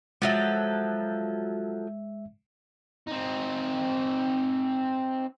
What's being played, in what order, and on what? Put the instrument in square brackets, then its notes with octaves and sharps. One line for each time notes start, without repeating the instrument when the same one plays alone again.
[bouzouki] F3 F#3 A4 [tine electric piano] G#3 E5
[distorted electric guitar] C4 D#4